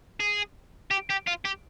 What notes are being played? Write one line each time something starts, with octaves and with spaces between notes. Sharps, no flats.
G#4
G4
G4
F4
G4